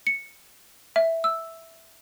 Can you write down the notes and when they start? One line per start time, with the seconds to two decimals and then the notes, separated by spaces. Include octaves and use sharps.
0.07 C#7
0.96 E5
1.24 E6